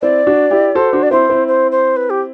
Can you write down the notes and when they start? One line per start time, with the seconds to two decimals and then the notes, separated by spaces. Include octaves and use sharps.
0.02 C4 E4 D5
0.27 D4 F#4
0.51 E4 G4
0.75 F#4 A4 C5
0.93 D4 F#4
1.03 D5
1.11 C4 E4 C5
1.29 C4 E4
1.48 C5
1.72 C5
1.96 B4
2.10 G4